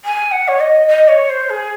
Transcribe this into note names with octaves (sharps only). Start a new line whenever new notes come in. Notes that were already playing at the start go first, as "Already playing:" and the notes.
G#5
F#5
C#5
D#5
D#5
C#5
C5
G#4